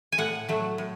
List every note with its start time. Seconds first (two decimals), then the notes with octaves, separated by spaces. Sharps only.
0.12 G#5
0.18 A2 F#5
0.49 F#3 A3
0.78 A2